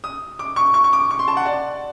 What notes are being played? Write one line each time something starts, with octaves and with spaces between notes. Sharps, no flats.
D#6
D6
C#6
C#6
C#6
D6
C#6
C6
A5
F#5
D5